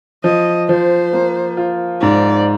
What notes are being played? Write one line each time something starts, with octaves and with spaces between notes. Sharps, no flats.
F3 D#5
F3 C5
A#3
F4
G#2 D5